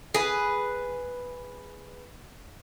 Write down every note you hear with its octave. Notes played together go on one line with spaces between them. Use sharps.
G#4 B4